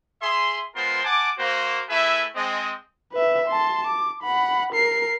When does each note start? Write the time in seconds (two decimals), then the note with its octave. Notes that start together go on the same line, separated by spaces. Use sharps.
0.22 G#4 E5 C6
0.75 G#3 B3 F4 A#4 C5 C6
1.04 F#5 G#5 A5 D6
1.38 A#3 F#4 C5
1.89 A3 E4 G#4 B4 E5
2.35 G#3 C4 D#5
3.13 B4 E5
3.48 A5 C6
3.87 D6
4.23 F#5 B5
4.73 A#4 C7